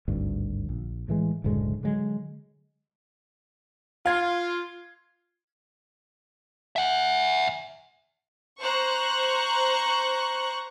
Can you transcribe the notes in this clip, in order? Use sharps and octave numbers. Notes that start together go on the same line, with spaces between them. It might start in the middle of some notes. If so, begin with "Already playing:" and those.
G#1 D2 G2
A#1
A2 E3 G#3
F#1 D2 A2 G#3
D3 F#3 G#3
F4 F5 G#6
E5 F#5
C5 A#5 C#6 F#6